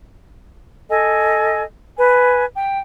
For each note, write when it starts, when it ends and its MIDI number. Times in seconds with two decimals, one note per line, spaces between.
0.89 1.62 69
0.89 1.62 75
0.89 1.62 80
1.97 2.45 71
1.97 2.45 80
2.55 2.80 79